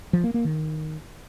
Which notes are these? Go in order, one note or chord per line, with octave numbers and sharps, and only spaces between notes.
F3
A#3
A#3
D#3